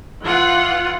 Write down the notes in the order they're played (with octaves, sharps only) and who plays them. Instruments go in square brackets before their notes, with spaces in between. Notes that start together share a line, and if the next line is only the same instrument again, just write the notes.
[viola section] E3 F4 F#5